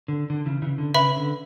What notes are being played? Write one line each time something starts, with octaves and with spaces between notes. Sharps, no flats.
D3
D3
C#3 E3
C#3 E3
D3
C#3 B4 E5 B5
D3